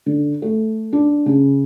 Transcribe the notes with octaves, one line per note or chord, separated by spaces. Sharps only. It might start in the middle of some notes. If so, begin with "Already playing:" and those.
D3
A3
D4
C#3